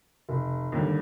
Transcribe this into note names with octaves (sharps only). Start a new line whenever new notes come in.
F1
D#2 D3 G3